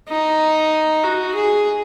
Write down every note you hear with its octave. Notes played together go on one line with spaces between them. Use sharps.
D#4
F#4
G#4